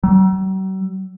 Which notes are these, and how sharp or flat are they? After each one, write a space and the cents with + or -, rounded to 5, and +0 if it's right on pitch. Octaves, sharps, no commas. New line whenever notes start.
F#3 +45